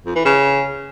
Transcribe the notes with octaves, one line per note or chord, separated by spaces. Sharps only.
F2
E3
C#3